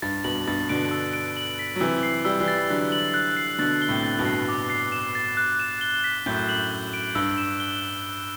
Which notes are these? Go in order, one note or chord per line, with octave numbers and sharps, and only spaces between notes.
G2 A6
G2 B2 F#7
G2 B2 A6
B2 D3 D7
E6
D7
F#7
B6
F#3
C3 E3 E6
C7
G3 E6
E3 G3
A6
D3 F#3 F#6
F#7
F#6
C7
B2 D3 A6
G7
A2 C3
A6
G2 B2
C7
D6
C7
E7
A6
F#6
E7
G7
B6
F#2 A2 G6
F#7
G6
D7
G2 E6
E7
G7